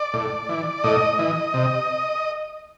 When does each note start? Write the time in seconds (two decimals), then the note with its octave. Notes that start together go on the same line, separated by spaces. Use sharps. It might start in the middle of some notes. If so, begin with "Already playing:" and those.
Already playing: D5
0.14 A2
0.49 E3
0.84 A2 D#5
1.19 E3
1.54 C3